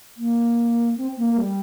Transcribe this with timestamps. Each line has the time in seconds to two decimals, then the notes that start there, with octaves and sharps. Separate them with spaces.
0.17 A#3
0.98 C4
1.18 A#3
1.28 A#3
1.38 G3